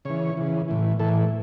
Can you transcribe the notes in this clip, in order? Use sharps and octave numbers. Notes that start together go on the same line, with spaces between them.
C#3 E3 C#5
C#3 E3
A2 E3
A2 E3 A4